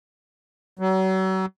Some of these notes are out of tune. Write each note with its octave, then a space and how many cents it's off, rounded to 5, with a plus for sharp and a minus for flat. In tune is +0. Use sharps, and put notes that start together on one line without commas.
F#3 +35